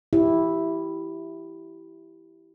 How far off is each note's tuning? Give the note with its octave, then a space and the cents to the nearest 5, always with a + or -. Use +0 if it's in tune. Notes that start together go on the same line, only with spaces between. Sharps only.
E4 +0 G4 -10